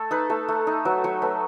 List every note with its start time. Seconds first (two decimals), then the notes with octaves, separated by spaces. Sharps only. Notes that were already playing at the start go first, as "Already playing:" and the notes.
Already playing: A3 A4
0.11 D#4 B4
0.30 A3 A4
0.48 A3
0.67 D#4
0.85 F#3 B4
1.04 F#3 C#5
1.22 A3 B4